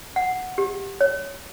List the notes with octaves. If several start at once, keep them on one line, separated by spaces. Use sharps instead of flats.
F#5
G4
C#5